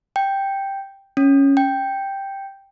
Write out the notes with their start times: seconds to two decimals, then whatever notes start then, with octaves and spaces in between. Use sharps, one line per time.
0.16 G5
1.17 C#4
1.57 G5